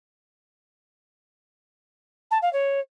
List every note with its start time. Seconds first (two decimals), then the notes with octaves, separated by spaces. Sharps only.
2.31 A5
2.42 F5
2.53 C#5